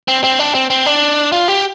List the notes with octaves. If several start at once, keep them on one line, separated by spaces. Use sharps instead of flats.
C4
C4
D4
C4
C4
D4
F4
G4